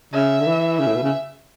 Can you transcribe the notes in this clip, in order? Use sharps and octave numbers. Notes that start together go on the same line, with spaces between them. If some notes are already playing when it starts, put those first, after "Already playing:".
C#3 E5
D3
E3
C#3 E5
A2
B2
C#3